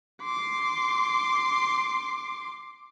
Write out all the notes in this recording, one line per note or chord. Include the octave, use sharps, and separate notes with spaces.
C6 D6